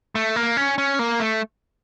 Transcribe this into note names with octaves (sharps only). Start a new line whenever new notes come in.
A3
A#3
C#4
C#4
A#3
A3